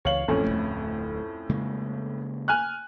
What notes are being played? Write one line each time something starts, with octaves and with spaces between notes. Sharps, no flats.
C#2 E3 C#5 F5 F#7
A1 F2 A2 C#4
D1 G#1 A3
C#3 G#3 A#3
G#5 F6 F#6